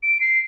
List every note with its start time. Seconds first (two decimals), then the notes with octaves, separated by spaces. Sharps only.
0.03 D7
0.21 C7